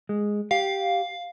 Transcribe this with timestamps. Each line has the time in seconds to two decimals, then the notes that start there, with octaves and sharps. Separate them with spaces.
0.09 G#3
0.51 G4 F5